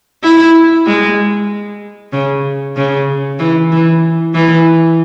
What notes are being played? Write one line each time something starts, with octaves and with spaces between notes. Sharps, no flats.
E4
G#3
C#3
C#3
E3
E3
E3